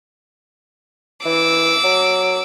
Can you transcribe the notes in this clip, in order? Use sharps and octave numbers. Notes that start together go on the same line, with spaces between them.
E3 D6 E6
F#3